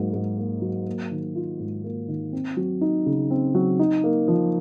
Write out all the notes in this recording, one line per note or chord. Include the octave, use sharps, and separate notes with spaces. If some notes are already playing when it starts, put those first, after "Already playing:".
Already playing: G#2 F#3 A#3
G#2
A#3
F#3
A#3
D#3
F4
G#2
A#3
D#3
C4
F#3
D#4
C#3
C4
F#3
D#4
A#3
F3